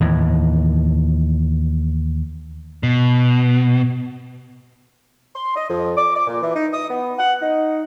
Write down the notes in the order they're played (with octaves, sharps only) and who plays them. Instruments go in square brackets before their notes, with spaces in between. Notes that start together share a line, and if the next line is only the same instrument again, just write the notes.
[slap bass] D#2 A2 E3
[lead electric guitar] B2
[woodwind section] C6
D#5
F2
D6
D6
A#2
E3
D#4
D#6
B3
F#5
D#4